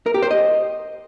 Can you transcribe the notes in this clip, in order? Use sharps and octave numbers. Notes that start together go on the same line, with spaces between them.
A#4
G4
C5
D#5